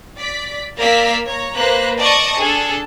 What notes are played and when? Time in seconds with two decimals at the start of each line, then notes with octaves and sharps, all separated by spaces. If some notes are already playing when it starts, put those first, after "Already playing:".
0.18 D5 B6
0.79 A#3 A#4 D5 F5 E6 B6
1.27 C#5 A#5
1.57 A#3 B4 C5 F#6
1.99 D5 D#5 A5 C#6 D#6
2.39 D4 G#4 A4